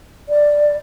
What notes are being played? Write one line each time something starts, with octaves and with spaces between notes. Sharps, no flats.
D5